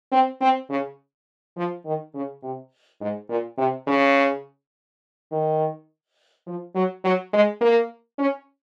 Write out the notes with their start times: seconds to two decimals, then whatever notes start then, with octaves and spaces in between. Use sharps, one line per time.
0.12 C4
0.41 C4
0.70 C#3
1.57 F3
1.86 D#3
2.14 C#3
2.43 C3
3.01 G#2
3.29 A#2
3.58 C3
3.87 C#3
5.32 D#3
6.47 F3
6.75 F#3
7.04 F#3
7.33 G#3
7.61 A#3
8.18 C#4